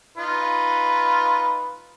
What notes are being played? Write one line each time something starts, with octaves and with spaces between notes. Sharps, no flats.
D#4 F4 B4